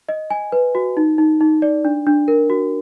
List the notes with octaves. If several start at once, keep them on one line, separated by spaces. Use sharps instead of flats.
D#5
G#5
B4
F#4
D#4
D#4
D#4
D5
D4
D4
A#4
F#4